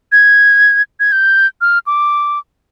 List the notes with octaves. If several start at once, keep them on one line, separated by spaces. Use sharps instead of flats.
G#6
G#6
G6
F6
D6